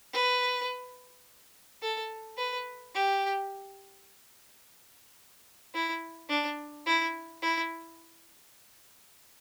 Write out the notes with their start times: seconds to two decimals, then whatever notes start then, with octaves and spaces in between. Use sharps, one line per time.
0.14 B4
1.82 A4
2.38 B4
2.95 G4
5.74 E4
6.29 D4
6.86 E4
7.42 E4